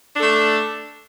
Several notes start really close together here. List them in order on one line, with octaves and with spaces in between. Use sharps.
D4 A4 A3